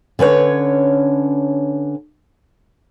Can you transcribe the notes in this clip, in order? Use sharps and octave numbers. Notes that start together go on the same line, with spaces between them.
D3 C#4 B4 C#5